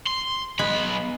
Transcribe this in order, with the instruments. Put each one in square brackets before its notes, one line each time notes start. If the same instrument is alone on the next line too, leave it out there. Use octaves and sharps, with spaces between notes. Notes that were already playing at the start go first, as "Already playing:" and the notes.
[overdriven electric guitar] C6
[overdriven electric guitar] B1 B5 [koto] G#3 B3 G#4